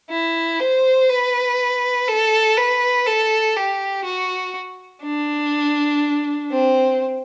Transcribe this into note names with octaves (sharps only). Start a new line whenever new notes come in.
E4
C5
B4
A4
B4
A4
G4
F#4
D4
C4